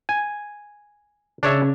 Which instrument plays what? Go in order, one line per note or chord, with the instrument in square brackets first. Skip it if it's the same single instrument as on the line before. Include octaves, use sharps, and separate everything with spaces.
[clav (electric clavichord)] G#5
[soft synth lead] C#3 [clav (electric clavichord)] D4 C#5 E5